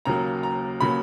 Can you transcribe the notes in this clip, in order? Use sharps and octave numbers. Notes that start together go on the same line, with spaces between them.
D#2 C#3 F#3 A#3 A#5
A#5
C#3 F#3 A#3 B5